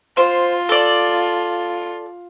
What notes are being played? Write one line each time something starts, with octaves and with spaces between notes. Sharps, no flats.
F4 C5
A4 D5